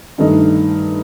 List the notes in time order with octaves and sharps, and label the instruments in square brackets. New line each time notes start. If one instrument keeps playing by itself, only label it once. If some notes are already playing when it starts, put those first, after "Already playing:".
[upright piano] G2 D#3 A3 D#4